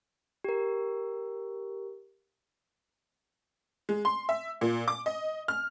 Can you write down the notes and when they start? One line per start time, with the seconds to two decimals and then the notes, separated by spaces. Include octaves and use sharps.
0.44 G4 A#4
3.89 G#3
4.05 C6
4.29 E5
4.61 A#2
4.88 D6
5.06 D#5
5.48 F6